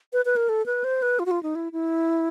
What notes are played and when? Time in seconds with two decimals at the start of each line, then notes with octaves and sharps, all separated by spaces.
0.13 B4
0.25 B4
0.36 A#4
0.49 A4
0.66 B4
0.84 C5
1.02 B4
1.19 F4
1.26 F#4
1.31 F4
1.43 D#4
1.55 E4
1.72 E4